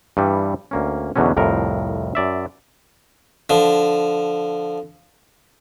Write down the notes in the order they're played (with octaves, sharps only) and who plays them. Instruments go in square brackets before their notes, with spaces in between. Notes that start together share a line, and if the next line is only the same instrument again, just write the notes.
[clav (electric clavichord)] G2 E3 G3
D2 A#3 C#4
E2 B2 D3 F#3 C#4
C2 F2 A2 A#4
F#2 D5 E5
[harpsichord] D3 F3